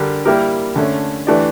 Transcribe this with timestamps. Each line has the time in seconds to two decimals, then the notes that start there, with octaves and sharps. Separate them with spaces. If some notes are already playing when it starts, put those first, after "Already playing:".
Already playing: D3 G3 D4 G4 A#4
0.25 G3 A#3 E4 G4 A#4
0.76 D3 A3 C#4
1.27 E3 A3 D4 G4 D5